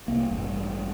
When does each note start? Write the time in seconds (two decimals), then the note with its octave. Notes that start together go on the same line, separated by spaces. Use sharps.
0.08 C2 A#3
0.31 A1 G2